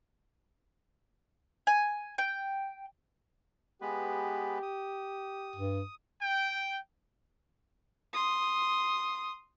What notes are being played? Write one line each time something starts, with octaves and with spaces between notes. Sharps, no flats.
G#5
G5
G#3 B3 G4 B4
D#6
G2
G5
C6 D#6